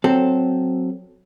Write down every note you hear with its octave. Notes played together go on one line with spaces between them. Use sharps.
F#3 C4 A4